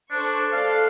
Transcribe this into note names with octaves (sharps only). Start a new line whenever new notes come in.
D4 A4 C5 C#6
A3 A4 D5 F5